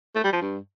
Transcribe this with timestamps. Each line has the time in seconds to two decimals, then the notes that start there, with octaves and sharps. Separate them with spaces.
0.15 A3
0.24 G3
0.33 F3
0.41 G2